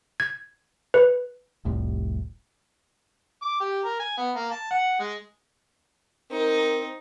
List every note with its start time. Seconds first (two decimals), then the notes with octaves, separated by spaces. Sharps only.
0.20 G#6
0.94 B4
1.65 F1 C2 A2
3.42 D6
3.60 G4
3.85 A#4
3.99 G#5
4.18 B3
4.36 A#3
4.51 A5
4.71 F#5
5.00 G#3
6.31 C4 D#4 A#4